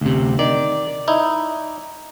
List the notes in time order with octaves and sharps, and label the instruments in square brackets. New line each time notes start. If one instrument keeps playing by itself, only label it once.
[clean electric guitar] D2 C3
[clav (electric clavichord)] D#3 [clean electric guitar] D5
[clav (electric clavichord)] D#4 E4